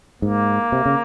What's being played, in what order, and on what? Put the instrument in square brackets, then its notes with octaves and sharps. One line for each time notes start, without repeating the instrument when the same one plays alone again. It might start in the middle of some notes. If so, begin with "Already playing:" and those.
[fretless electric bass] G#2 [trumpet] A#3
[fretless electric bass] C3
C#3